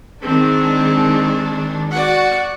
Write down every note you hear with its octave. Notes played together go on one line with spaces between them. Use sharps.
D#3 G#3 C4 D4
F#4 D5 F#5